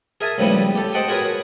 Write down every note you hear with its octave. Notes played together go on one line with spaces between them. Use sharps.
G#4 A#4 E5 G#5 A5
C#2 A2 C#3 F3 G3 B3
G4 A4
C5 D#5 F#5 G5 A5 D6
F#4 G#4 A#4 B4 C#5